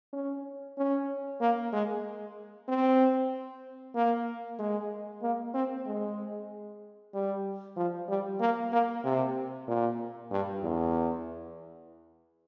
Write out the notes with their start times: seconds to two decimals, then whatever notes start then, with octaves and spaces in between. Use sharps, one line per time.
0.13 C#4
0.78 C#4
1.41 A#3
1.73 G#3
2.68 C4
3.95 A#3
4.59 G#3
5.22 A#3
5.54 C4
5.86 G#3
7.14 G3
7.76 F3
8.09 G3
8.40 A#3
8.72 A#3
9.04 C3
9.68 A#2
10.31 G2
10.63 E2